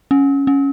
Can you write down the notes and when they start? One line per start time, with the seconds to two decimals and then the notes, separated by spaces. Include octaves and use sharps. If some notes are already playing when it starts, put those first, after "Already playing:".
0.11 C#4
0.47 C#4